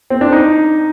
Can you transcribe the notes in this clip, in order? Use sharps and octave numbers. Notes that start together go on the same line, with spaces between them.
C4
D4
D#4